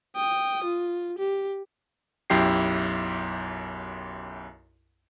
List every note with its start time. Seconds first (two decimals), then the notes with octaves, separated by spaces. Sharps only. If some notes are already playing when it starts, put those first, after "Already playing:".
0.16 G5 D#6
0.64 F4
1.19 G4
2.30 B1 F#2 E4 G4 C7